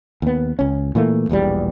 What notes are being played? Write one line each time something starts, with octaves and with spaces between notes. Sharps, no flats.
D#2 B3
C#2 C#4
A#2 E3 A3 A#3
E1 A#1 E2 G3